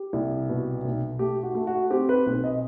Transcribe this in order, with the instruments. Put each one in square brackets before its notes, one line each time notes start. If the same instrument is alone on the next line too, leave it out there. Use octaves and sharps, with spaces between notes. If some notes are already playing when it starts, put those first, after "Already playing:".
Already playing: [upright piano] G4
C2
B2
B1
A3 G4
F#4
A3
F#4
C4 G4
B4
B1
D#5